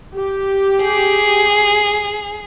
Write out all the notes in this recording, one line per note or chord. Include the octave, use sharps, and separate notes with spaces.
G4
G#4